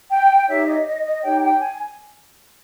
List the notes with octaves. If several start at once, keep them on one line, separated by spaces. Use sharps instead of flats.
G5
D#4 G4 C#5 E5
D#5
D#5
D#5
D#4 G4 C#5 G5
G5
G#5